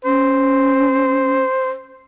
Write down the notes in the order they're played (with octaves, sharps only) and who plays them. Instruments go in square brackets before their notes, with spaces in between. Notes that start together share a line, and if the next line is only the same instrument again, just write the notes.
[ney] C#4 [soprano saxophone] C5